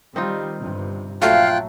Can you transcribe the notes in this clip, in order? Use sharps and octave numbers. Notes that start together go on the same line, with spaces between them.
D#3 G3 C4 D#4 F4
G1 G2 C3
A#1 F#3 A3 F4 F5 G5 F#6